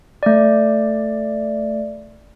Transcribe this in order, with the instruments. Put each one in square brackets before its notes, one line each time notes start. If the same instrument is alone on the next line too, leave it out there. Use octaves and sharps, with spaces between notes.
[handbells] A3 D5